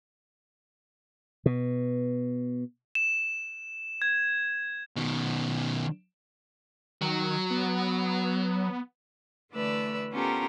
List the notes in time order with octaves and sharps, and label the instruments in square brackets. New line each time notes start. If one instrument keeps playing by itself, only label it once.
[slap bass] B2
[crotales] E7
G#6
[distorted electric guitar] B2 D#3
[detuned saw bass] D#3 [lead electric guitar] F#3
[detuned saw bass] B3
[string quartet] D3 E3 A3 B4 D5 E6
B3 C#4 F4 G4 A4 A#4